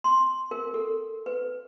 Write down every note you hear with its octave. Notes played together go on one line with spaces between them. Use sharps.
C6
A#4
A4
B4